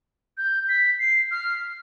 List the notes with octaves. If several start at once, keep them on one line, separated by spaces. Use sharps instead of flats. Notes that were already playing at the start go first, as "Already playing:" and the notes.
G6
B6
C7
F6